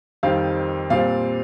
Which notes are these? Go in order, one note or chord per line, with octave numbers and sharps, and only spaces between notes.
F2 D#3 G3 C4 F5
A#2 G3 C4 F5